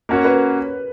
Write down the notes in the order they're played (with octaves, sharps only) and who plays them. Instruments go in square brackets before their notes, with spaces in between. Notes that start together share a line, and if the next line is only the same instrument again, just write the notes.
[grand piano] A#3 C#4 F#4 C#5 [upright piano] A#4
[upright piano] B4